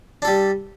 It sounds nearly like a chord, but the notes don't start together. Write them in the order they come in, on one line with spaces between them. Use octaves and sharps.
D4 A4 G3